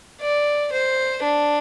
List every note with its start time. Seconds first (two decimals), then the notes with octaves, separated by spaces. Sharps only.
0.21 D5
0.72 C5
1.23 D4